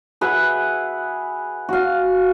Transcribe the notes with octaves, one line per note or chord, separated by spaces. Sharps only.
G#4 B4 E5 F#5
F#4 F5